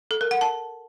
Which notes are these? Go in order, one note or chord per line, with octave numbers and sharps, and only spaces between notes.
A4
A#4
F#5
A5